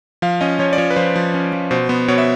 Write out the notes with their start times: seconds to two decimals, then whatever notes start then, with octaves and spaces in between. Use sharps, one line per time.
0.22 F3 F5
0.41 C#4 D#5
0.59 F3 C#5
0.73 D5
0.78 F3 C#5
0.90 B4
0.96 F3 C5
1.15 F3
1.34 C#4
1.53 F3
1.71 B2 C5
1.89 B3 C5
2.08 B2 C#5
2.18 E5